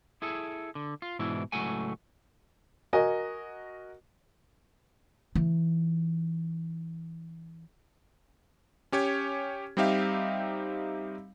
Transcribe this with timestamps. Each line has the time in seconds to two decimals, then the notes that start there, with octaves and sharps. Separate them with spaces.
0.22 E4 G#4 A4
0.75 D3
1.02 F4
1.19 G#2 B2 E3 D4 E4
1.52 C#2 A2 F#3 A3 F#5 G#5
2.93 F#4 A#4 D#5 G#5
5.35 E3 D#4
8.92 C#4 G4 C#5 G#6
9.77 G3 C4 D#4 G4 E5 F5